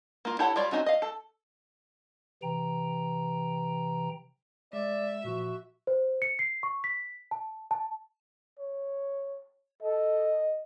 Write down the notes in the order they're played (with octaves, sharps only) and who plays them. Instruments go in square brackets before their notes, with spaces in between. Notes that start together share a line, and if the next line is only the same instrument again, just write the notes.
[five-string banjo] A#3 F4
E4 G4 A4 C#5 F#5
G3 F4 C#5 D5
C4 C#4 D#4 F#4
D#5 F5
A4
[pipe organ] C3 E3 G5 A#5
[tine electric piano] G#3 [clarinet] D5 [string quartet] E5
[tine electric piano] A#2 F3 [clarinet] F#4
[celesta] C5
C#7
C7
C#6
B6
A5
A5
[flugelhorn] C#5
[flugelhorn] A4 [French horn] D#5